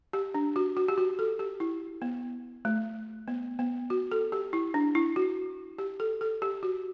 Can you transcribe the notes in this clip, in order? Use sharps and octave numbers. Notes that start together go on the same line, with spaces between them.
G4
D4
F#4
F#4
G4
F#4
A4
G4
E4
B3
A3
B3
B3
F#4
A4
G4
E4
D4
E4
F#4
G4
A4
A4
G4
F#4